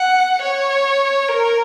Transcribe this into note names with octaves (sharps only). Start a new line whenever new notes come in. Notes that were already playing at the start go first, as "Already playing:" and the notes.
Already playing: F#5
C#5
A#4